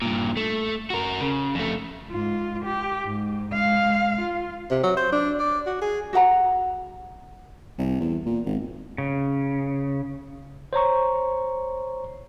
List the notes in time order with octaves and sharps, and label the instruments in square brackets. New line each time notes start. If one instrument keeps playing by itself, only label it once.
[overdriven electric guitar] G2 A#2
A3
F#4 A#4
C#3
F2 A3
[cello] G#2 F4
G4
G#2
G#3 F5
F4
[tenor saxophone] C3
F#3
C5
D4
D5
F#4
G#4
[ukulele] F#4 A4 F#5 A#5
[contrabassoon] C2
E2
A#2
G#1
[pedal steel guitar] C#3
[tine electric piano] C5 C#5 A#5 C#6